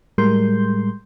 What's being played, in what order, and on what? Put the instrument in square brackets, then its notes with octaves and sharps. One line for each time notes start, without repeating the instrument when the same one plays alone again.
[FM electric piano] A2 G3 G#3 A#4 C6 G6